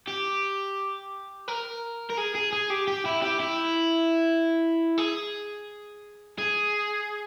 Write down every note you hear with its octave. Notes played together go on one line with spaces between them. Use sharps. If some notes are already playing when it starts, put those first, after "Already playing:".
G4
A#4
A#4
G#4
G#4
G#4
G4
G4
E4
G4
E4
G#4
G#4